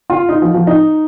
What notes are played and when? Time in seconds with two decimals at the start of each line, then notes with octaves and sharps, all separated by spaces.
0.10 F4
0.29 D#4
0.42 F3
0.54 F3
0.67 D#4